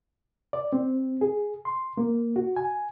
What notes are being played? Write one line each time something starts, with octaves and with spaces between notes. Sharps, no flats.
D5
C4
G#4
C6
A#3
F#4
G#5